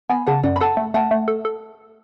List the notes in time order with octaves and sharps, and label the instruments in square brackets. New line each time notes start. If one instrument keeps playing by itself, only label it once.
[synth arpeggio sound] B3 [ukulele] G#5 B5
[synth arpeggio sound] C#3 [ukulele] F#5 A5
[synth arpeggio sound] F#2 [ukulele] D5 F#5
[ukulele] B5
[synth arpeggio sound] A4 [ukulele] F#5 A5
[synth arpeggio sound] A3
[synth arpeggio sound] A3 [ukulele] F#5 A5
[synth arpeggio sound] A3
A4
A4